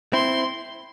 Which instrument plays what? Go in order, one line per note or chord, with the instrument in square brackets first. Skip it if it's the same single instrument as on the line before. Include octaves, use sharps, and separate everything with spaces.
[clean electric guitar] C4 E4 [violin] C6